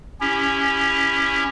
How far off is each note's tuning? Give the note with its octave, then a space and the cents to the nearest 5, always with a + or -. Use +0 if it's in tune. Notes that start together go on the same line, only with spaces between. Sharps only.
C#4 +0 E4 +0 G4 +25